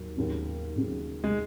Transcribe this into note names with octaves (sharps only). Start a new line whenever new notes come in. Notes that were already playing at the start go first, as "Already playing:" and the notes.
Already playing: D#2 F#3
D#2 C#3 F#3
D#2 C#3 F#3
G#3